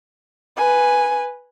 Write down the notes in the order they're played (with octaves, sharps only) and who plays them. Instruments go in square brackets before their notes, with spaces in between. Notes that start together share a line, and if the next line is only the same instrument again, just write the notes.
[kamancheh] B4 G#5